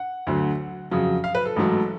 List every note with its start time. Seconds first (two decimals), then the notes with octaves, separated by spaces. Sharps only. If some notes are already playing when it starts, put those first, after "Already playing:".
Already playing: F#5
0.27 D2 D3 F#3
0.91 F2 C#3 F#3
1.24 F5
1.35 B4
1.45 A4
1.56 A1 G#2 F#3 A3